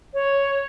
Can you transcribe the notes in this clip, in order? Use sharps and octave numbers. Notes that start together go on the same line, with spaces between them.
C#5